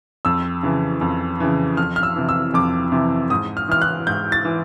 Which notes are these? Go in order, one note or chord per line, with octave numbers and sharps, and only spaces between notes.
F2 E6
C#3 E3
F2
C#3 E3
F2 F6
F6
E6
C3 E3
E6
F2 D6
C3 E3
G#2 D#6
F6
E3 F6
F#6
G#2 G6
A6
E3